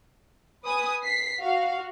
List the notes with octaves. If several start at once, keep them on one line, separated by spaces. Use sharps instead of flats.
B4 G#5 D#6
B6 C7
F#4 F5